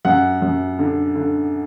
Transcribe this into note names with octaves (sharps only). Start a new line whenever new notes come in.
F#2 F#5
F#2
D3
D3